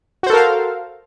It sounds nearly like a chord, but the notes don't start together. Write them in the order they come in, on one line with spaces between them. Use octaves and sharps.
F#4 C5 A4 A#4 F5